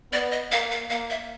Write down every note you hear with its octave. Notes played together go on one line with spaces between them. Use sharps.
B3 D5
D#5
A#3 F5
F5
A#3 F5
E5